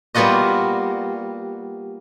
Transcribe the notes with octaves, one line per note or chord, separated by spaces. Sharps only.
G3 A#3 B3 F4 F#4 D#5